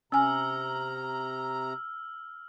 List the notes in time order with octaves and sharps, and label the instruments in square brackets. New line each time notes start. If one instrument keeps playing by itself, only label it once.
[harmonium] C3 A#5 [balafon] C#4 G#5 [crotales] E6 F6